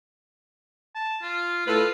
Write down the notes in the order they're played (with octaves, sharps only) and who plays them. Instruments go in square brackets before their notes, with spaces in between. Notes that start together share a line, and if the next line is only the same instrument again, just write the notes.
[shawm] A5
F4
[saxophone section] A2 A4 B4 [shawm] F4